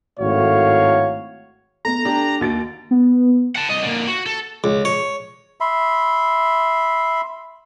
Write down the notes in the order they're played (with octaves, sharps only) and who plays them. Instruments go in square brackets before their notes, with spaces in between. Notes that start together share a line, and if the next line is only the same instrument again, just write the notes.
[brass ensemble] G#1 A2 A3 F#4 C#5 F5
[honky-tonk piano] A3 B3 [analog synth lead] A#5
[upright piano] D4 G4
[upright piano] D#2 [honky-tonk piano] F#4 A6 D7
[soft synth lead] B3
[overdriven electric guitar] F#5 A5
C2 D#5
D3 A#3
F#4
A4
[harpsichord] C#2
C#5
[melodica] E5 B5 C6